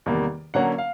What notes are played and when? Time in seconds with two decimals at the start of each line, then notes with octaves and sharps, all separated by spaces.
0.06 E2 C3 D#3 G3 A#3
0.54 D3 F#3 A#3 C#4 F#5
0.78 F5